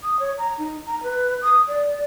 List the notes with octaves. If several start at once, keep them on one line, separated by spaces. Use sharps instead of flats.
D#6
C#5
A#5
D#4
A#5
B4
D#6
D5